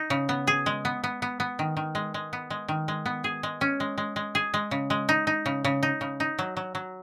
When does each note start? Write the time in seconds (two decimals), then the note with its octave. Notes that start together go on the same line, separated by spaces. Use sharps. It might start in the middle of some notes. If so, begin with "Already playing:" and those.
Already playing: D#4
0.10 C#3
0.29 B3
0.47 G#4
0.66 G#3
0.85 B3
1.04 B3
1.22 B3
1.40 B3
1.59 D#3
1.77 D#3
1.95 G#3
2.14 G#3
2.33 B3
2.50 G#3
2.68 D#3
2.88 G#3
3.06 B3
3.24 G#4
3.43 G#3
3.61 C#4
3.80 G#3
3.98 G#3
4.16 G#3
4.35 G#4
4.54 G#3
4.71 C#3
4.90 G#3
5.09 D#4
5.27 D#4
5.46 C#3
5.65 C#3
5.83 D#4
6.01 C#3
6.20 D#4
6.39 F#3
6.57 F#3
6.75 F#3